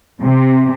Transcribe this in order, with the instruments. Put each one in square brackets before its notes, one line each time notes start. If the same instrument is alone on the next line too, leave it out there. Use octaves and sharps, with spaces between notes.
[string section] C3